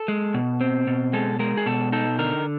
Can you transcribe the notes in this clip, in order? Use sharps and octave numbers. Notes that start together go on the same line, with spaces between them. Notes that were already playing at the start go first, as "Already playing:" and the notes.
Already playing: A4
G#3
B2
C4
B2
G#3 A4
G#3 A#4
G#4
B2 A4
D#4 A4
D3 A#4